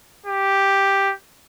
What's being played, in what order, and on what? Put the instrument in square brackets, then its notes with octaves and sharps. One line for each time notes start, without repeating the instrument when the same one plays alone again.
[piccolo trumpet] G4